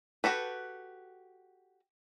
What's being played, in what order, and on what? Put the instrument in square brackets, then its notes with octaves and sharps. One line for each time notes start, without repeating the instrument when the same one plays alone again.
[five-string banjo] F#4 G4 A4 B4